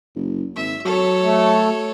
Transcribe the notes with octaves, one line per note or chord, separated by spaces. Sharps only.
F#1
G#1 E5
F#3 A4 C#5
A3